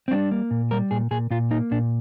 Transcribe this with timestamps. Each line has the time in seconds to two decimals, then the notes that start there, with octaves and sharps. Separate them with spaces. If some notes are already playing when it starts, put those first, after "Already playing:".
0.08 C4
0.11 G3 D4
0.32 A#3
0.51 A#2
0.71 G3 A#4
0.91 A#2 G#4
1.11 A#2 G#4
1.30 A#2 F4
1.51 A#3 D#4
1.71 A#2 D4